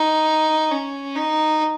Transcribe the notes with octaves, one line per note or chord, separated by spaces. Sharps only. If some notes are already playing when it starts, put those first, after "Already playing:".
Already playing: D#4
C#4
D#4